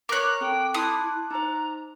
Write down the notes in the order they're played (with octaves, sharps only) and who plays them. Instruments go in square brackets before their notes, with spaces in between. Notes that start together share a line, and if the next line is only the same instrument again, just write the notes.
[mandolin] A#4 C#5 [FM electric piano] D6 F#6
[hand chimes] C4 A4 [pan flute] G5
[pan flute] E4 [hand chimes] A5 C6 [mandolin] D#6
[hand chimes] D#4 C5 [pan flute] A#5